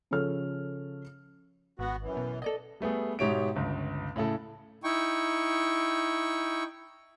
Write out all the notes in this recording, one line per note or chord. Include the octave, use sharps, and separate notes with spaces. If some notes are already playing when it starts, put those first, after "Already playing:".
C#3 F3 A4 C#5 F6
G#1 B3 F#4
F#2 E3
B2
A4 D5 D#5
G3 A3 B3 G#4
G#2 B2 G4 C#5 E5 D7
G1 C#2
A2 C#3 E4 A4
D#4 E4 G5 C#6